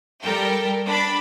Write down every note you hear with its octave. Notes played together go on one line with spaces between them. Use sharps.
G3 A4 A#4 G5
D4 B5